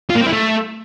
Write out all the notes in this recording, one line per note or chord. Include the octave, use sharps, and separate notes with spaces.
F4
A#3
C4
E4
A3